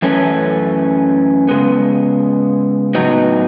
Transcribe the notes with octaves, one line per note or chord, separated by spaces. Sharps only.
F#2 E3 A3 C#4
C#3 G#3 B3
A2 F#3 B3 D#4 F#4